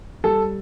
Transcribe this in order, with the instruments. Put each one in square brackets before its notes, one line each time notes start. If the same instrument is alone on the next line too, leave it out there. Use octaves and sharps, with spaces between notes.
[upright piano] G3 A4